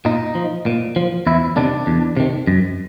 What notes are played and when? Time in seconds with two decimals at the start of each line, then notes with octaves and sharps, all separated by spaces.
0.05 A#2 D#4
0.35 F3
0.66 A#2
0.96 F3
1.27 E2 E4
1.57 C3 D#3 D4
1.87 E2
2.17 C3 D#3
2.47 F#2